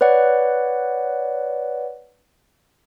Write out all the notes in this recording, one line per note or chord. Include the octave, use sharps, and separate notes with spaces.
B4 C#5 D5 F#5